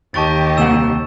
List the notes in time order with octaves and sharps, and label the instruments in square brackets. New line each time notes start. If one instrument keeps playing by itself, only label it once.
[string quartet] D#2 [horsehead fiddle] G4 D#5 [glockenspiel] A5 C#6 A6
[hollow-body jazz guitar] C2 A#3 F#5 [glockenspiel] E6 E7